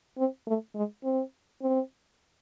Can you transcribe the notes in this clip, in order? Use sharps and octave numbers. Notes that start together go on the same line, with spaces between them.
C4
A3
G#3
C4
C4